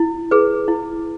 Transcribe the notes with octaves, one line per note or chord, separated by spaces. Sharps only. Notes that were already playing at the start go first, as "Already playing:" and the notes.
Already playing: E4
G#4 B4
E4